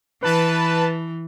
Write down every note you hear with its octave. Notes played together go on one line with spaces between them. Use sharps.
E3 B4 A5